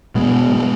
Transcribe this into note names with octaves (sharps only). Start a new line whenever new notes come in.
B2 G#3 B3
B2 G#3 B3